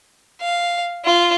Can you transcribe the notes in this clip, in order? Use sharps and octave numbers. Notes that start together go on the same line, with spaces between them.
F5
F4